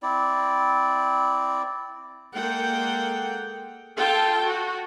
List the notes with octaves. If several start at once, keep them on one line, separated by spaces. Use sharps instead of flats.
C4 E4 D5
G#3 A#3 A4 F#5 G5
F4 A4 G5 A5
F#4